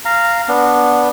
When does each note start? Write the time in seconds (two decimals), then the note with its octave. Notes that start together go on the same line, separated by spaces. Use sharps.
0.05 F5 A#5
0.48 B3 D4